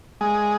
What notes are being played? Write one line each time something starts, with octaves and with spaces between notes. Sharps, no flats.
G#3